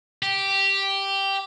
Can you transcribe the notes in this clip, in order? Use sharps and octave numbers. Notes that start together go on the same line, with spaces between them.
G4